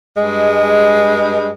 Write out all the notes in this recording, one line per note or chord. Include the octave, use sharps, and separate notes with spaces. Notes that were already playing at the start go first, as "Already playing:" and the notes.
G2 G#3